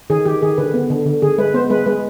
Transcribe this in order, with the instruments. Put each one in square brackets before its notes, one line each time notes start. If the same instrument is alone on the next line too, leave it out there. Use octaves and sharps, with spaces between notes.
[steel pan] D#3 G#4
D#3 G4
D#3 G#4
D3 B4
B3
D3
D3
D3 G#4
G#3 B4
B3 C5
G#3 B4
G#3 B4